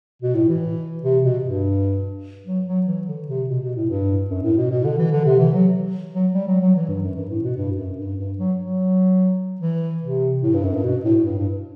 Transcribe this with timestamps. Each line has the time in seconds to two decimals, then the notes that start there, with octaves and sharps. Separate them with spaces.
0.22 B2
0.35 A2
0.48 E3
1.03 C3
1.23 B2
1.44 G2
2.46 F#3
2.66 F#3
2.86 E3
3.07 D3
3.27 C3
3.49 B2
3.62 B2
3.75 A2
3.89 G2
4.30 F#2
4.43 A2
4.57 B2
4.71 B2
4.84 D3
4.98 E3
5.12 D3
5.25 C3
5.39 E3
5.53 F#3
6.13 F#3
6.34 G3
6.47 F#3
6.61 F#3
6.75 E3
6.88 G2
7.02 F#2
7.16 G2
7.29 A2
7.43 B2
7.56 G2
7.77 F#2
7.98 G2
8.17 G2
8.38 F#3
8.59 F#3
9.60 E3
10.02 C3
10.43 A2
10.53 G2
10.63 F#2
10.73 G2
10.83 B2
11.04 A2
11.16 A2
11.24 G2
11.38 G2